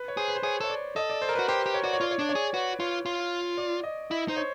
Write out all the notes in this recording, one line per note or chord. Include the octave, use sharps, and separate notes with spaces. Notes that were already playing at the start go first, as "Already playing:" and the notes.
Already playing: B4
C#5
G#4 C5
B4
C5
G#4 C#5
A4 C#5
D5
A4 D#5
D5
C5
A#4
F#4 B4
G4 C5
G4
C#5
F#4 D5
C#5
F4 D5
C#5
D4 D5
C#5
G#4
F#4 B4
F4 C#5
F4
D5
D#5
E4 D#5
D#4 C5
C#5